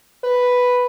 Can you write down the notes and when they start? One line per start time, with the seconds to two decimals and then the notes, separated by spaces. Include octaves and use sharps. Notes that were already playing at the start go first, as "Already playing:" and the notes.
0.23 B4